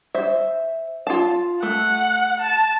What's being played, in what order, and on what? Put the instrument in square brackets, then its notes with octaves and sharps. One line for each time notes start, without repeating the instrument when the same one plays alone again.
[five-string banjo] C5 E5
F4 F5 A5
[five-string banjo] A3 [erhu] F#5
[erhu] A5